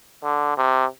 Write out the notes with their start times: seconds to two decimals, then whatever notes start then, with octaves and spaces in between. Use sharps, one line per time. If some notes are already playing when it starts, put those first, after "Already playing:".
0.24 D3
0.58 C3